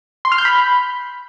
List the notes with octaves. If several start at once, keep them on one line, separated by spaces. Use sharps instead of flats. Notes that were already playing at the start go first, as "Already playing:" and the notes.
C6
F6
G6
B5